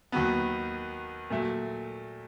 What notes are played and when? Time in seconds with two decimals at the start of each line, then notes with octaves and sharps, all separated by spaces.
0.12 D#2 D#3 F#3 B3
1.30 A#2 F#3 A3